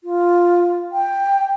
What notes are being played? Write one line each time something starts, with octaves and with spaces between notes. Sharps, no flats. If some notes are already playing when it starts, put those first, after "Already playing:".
F4
G5